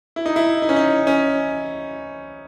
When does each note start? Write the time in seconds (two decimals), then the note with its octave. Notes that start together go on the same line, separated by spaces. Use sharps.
0.16 E4
0.26 D#4
0.36 E4
0.62 D#4
0.69 C#4
0.76 D#4
1.07 C#4